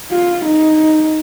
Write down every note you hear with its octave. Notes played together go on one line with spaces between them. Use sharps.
F4
D#4